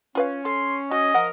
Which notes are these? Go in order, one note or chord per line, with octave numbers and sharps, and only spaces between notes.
C#4 F4 B4 F5
A4 C6
F#4 D#5
F3 A#4 F#5